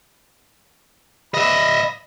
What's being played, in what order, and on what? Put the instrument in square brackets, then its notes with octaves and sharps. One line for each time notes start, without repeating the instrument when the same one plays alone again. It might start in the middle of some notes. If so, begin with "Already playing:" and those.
[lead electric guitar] D#5 E5 [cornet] B5